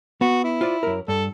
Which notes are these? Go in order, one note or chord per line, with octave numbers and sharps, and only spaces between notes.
B3 F#4
E4
F4 C5 D5
F#2 A#4
G2 A4